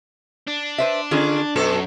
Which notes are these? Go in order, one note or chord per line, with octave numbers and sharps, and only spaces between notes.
D4
B4 C5 E5
D3 C#4 F4 G#4
F#2 B2 F#4 A4